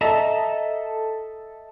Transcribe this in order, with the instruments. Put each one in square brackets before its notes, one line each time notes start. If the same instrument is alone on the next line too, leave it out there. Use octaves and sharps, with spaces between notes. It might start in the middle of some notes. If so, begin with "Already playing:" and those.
[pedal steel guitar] A4 D#5 E5 A5 A#5